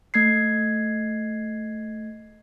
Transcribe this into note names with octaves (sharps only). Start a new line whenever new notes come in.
A3 G#6 C7